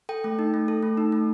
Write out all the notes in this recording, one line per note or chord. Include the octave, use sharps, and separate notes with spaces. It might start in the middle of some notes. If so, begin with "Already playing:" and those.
A4 G5
A3
D#4
A3
A4
A3
D#4
A3